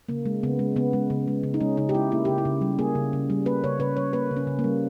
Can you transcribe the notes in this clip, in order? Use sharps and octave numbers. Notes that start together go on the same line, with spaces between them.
C#3 A#3
G#3
C#3 B3
G#3
C#3 B3
G#3
C#3
G#3
C#3
D#4
G#3 C#4
C#3 D#4
G4
G#3 E4
A#3 E4
C#3 G4
E4
C#3
G3
A#3 G#4
C#3
C#3
G3
A#3 B4
C#3 C#5
C#3 B4
G3 C#5
A#3 B4
C#3
C#4
C#3
A#3
G3